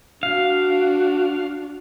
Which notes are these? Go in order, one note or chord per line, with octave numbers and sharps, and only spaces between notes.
D4 F#4 F5